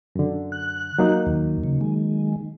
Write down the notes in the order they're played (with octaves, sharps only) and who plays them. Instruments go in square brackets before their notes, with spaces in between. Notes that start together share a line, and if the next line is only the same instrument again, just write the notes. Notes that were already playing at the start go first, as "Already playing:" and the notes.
[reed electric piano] F#2 D3
[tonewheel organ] F#6
[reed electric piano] F#3 A#3 D#4
[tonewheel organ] D#2 D#3
C#3
D#3 G#3